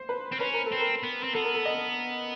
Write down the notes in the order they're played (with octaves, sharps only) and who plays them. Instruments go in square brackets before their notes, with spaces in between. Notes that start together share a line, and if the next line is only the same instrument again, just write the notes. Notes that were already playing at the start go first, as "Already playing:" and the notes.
Already playing: [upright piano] C5
B4
[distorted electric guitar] C4
[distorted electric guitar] C#4 [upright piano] B4
[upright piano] A#4
A4
[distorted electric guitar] C4
[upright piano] A#4
[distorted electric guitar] B3
C4
[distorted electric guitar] B3 [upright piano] A4
[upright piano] A#4
A4
D#5